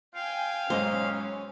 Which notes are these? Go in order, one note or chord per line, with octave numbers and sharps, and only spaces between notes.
F5 G5 G#5
B1 G#2 C#4 C5 D#5